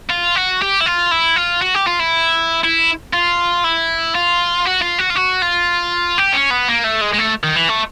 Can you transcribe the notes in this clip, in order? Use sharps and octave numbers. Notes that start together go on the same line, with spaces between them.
F4
F#4
G4
E4
F4
E4
F4
F#4
G4
F4
E4
E4
F4
E4
F4
F#4
F4
F#4
F4
F#4
F4
G4
C#4
B3
A#3
A3
G#3
G#3
A3
D#3
E3
A3